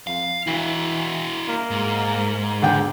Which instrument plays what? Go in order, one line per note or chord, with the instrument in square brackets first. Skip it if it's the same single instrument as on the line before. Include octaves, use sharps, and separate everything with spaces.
[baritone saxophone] F2 [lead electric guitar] F5
[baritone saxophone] E3 [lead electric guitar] E4 F#4
[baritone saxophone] A#3
[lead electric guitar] G#2
[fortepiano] D3 G5 [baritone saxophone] G#4